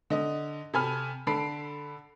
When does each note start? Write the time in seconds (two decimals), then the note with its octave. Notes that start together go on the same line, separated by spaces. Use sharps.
0.10 D3 D#5
0.74 C3 A4 G#5 B5 F6
1.27 D3 A4 B5 C7 D7